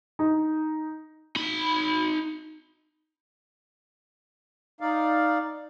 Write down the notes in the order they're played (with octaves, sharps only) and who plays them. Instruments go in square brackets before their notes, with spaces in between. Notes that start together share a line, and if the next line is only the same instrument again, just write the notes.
[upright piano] D#4
[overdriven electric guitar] D#4 B5
[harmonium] D#4 D5 F5